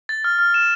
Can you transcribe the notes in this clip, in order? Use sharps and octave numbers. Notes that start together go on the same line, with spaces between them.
A6
F6
F6
E7